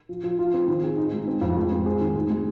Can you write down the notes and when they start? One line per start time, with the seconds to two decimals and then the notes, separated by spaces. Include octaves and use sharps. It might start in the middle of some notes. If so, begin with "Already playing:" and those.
0.09 F3
0.23 F3
0.39 F4
0.54 C4
0.68 D#3
0.83 G#4
0.98 D#4
1.12 G#3
1.27 C4
1.41 F2
1.56 G#3
1.72 C4
1.86 G#4
2.01 D#3
2.16 G#3
2.31 G#3